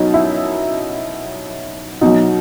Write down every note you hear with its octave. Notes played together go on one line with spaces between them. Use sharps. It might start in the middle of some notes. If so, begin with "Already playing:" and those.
Already playing: B2 F#3 C#4 D#4
E4
B2 F#3 D#4